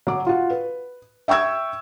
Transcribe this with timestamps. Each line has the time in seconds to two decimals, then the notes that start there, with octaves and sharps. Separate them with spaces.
0.07 F#3 D6
0.27 F4 F#4
0.50 B4
1.28 E5 G5 C#6 E6 G#6